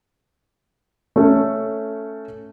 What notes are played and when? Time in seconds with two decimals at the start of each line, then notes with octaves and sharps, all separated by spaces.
1.16 A3 C#4 A4